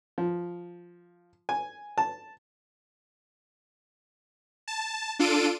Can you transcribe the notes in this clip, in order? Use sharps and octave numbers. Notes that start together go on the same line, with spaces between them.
F3
G#5
A5
A5
D4 F4 A4 D7 D#7